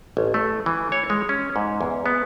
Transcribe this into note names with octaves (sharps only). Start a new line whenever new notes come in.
A1
A3
E3
C#5
G#3
C#4
G#2
E2
B3